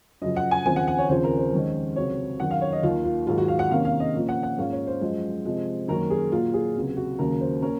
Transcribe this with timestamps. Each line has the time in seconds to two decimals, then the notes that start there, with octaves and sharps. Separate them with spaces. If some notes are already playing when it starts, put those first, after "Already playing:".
0.22 F#2 C#3 F3 D#5
0.36 F#5
0.51 G#5
0.66 D#2 C#3 F3 C4 G#5
0.76 F#5
0.88 F#5
0.98 C#5
1.09 D#2 C#3 F3 C4 C5
1.24 A#4
1.38 C5
1.52 F2 D#3 G#3 C#4
1.96 C#2 C3 F#3 C4 C#5
2.40 F#2 D#3 F#3 F#5
2.51 F5
2.61 C#5
2.72 D#5
2.83 D#2 D#3 A#3 F4
3.05 F4
3.27 G#2 D#3 F#3 F4
3.38 F#4
3.48 F5
3.59 F#5
3.70 C3 D#3 A#3 C#4 F5
3.85 F5
4.00 D#5
4.14 A#2 F3 A#3 C#4
4.29 F#5
4.43 F#5
4.58 G#2 F3 A#3 C#4 F5
4.72 C#5
4.87 C5
5.01 F#2 F3 G#3
5.45 C3 F3 G#3
5.88 F#2 D#3 A#3 C#4 A#4
6.10 G#4
6.32 A#2 F#3 A#3 F4
6.54 G#4
6.75 C#2 C3 F#3
6.97 F#4
7.19 D#2 C#3 F#3 A#3 C#4 A#4
7.41 C5
7.62 A#3 C#4 A#4